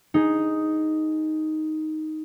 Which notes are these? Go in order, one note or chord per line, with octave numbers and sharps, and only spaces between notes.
D#4 G#4